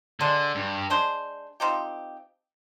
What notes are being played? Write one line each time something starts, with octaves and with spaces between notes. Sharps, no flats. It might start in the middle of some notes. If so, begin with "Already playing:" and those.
D3 G#3 D4 G#4 C5
G2
G#3 D4 G#4 C5
F3 C4 D#4 G4